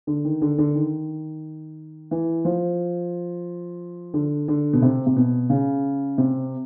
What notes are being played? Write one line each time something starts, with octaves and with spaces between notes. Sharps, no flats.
D3
D#3
D3
D3
D#3
E3
F3
D3
D3
B2
C3
C3
B2
C#3
C3